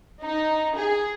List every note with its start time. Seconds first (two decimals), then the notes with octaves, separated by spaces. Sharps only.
0.24 D#4
0.76 G#4